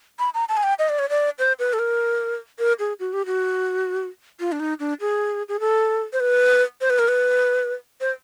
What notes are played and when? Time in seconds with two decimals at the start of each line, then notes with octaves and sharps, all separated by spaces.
0.19 B5
0.34 A#5
0.49 A5
0.57 G#5
0.63 G5
0.79 D#5
0.89 D5
0.99 C#5
1.09 D5
1.39 C5
1.59 B4
1.73 A4
1.79 A#4
2.59 A#4
2.79 G#4
3.00 F#4
3.13 G4
3.26 F#4
4.40 F4
4.52 D4
4.60 D#4
4.80 D4
5.01 G#4
5.49 G#4
5.60 A4
6.13 C5
6.20 B4
6.81 C5
6.90 B4
6.99 A#4
7.08 B4
8.01 C5